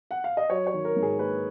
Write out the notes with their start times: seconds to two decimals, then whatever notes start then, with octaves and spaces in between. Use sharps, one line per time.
0.11 F#5
0.24 F5
0.37 D#5
0.49 F#3 C#5
0.67 C#5
0.74 D#3
0.85 A#4
0.96 G#2
1.02 G#4
1.18 A#3 B4